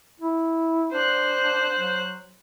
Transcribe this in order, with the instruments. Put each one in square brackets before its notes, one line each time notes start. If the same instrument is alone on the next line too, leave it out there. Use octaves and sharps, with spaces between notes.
[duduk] E4
[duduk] D4 [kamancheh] C5 F#6
[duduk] F#3